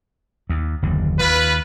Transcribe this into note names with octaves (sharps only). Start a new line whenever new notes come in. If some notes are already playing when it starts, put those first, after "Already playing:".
D#2
F#1 D#2 D3
D#2 F4 B4